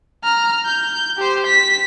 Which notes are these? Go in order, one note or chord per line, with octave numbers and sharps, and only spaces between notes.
A#5 F6
G6
G4 C5
B6